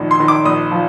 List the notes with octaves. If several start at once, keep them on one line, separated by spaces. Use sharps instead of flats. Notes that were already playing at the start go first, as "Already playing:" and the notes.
Already playing: A#1 D#3
C6
D#3
D6
A#1 D#6
F3